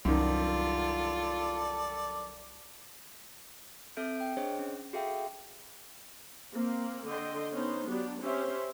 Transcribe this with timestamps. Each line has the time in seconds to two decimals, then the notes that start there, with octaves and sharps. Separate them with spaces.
0.05 C2 F#2 D#3 F4 A4 D5
3.97 C4 A4 E5 G6 D7
4.20 G5
4.37 D4 G#4 C5 C#5 D#5
4.59 C#4
4.93 F#4 G#4 A4 E5 F5 G5
6.53 A#3 C4
7.08 D3 D#5 G5 C6
7.53 B3 C#4 D#4 C5
7.87 F#3 B3 D4 G4
8.22 C4 C#4 G4 C5 E5